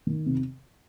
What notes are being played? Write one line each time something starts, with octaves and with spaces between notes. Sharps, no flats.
D#3
C3